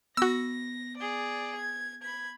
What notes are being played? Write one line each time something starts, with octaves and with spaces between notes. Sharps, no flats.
B3 F#4 E6 A#6
G#4 D5
G#6
B5 G#6